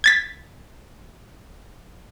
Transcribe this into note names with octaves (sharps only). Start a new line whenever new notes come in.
G#6 A6 B6